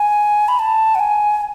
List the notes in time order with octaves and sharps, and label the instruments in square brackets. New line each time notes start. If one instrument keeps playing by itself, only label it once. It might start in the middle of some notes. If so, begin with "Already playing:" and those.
Already playing: [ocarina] G#5
B5
A5
F#5
G#5